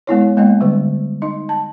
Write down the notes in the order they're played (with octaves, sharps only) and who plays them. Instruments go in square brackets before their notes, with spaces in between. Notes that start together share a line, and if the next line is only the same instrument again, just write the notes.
[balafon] G#3 B3 E4 C#5
G#3 A#3 B3 D#5
D3 G3
D#4 D#5
A5